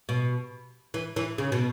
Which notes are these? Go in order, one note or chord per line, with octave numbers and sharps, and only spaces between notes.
B2
E3
E3
C#3
B2